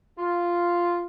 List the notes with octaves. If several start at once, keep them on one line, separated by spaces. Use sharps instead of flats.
F4